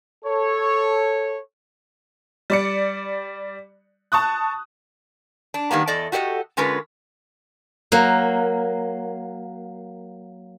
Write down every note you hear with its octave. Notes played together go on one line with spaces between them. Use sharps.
A4 C#5
G3 D5 C#7
A5 C#6 D#6 F#6
D4
D#3 G3 A#3 B3
E2 A4 D5 D#5
F#4 G4 A4 D5 D#5
D3 G#3 C#4 F4 A#4 B4
F#3 A#3